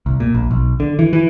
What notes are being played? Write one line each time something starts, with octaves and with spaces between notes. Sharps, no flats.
C2
A#2
A#1
B1
D3
E3
E3